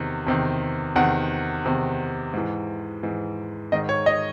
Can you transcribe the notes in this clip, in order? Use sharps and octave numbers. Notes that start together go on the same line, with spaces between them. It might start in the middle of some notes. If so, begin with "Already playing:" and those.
Already playing: E2 C3 D#3
E2 C3 D#3
E2 C3 D#3 F#5
E2 C3 D#3
G#2 E3
G#2 E3
G#2 D#3 D#5
C#5
D#5